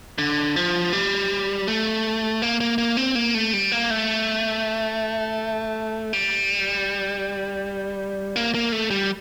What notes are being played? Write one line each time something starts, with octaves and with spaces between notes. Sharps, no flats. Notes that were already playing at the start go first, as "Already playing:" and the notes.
D3
F3
G3
A3
A#3
A#3
A#3
C4
A#3
A3
G3
A#3
A3
G3
A#3
A#3
A3
G3